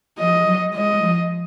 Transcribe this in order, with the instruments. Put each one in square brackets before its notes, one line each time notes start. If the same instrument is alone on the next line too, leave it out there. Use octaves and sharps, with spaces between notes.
[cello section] F3 [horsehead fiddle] D#5
[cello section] F#3
[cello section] G#3 [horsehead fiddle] D#5
[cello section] F3